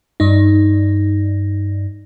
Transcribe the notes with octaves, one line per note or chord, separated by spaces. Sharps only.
G2 D#4